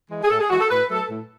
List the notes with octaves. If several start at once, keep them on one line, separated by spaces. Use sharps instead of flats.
E3 G#3
G#4
A2 A4
G#4
E3 G#3 F#4
A4
A2 B4
F#3 A3 A4
A2